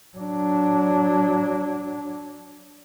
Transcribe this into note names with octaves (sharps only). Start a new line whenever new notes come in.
F#3 D4